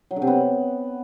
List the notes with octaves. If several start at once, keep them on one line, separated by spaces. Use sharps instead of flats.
F#3
D3
C3
B3